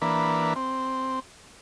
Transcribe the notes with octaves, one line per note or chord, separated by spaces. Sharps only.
E3 A#3 D4 B4
C4